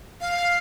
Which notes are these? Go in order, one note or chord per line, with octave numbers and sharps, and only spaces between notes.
F5